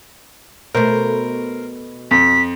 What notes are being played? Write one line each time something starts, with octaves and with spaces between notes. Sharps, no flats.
B2 A3 A#4 C5
F2 B6